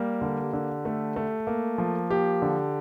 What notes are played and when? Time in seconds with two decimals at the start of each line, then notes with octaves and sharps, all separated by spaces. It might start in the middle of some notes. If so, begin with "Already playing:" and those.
Already playing: G3 A#3 G4
0.22 D3
0.53 D3
0.85 A3
1.16 A3
1.47 A#3
1.78 F3
2.10 A#3 G4
2.42 D3